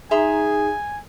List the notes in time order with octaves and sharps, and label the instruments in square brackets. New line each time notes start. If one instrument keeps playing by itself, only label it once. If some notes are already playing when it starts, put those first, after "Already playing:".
[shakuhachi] D#4 [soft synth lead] G#4 [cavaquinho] E5 A#5 C6 [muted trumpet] G#5